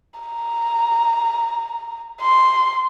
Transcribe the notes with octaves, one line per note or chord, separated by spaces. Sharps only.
A#5
C6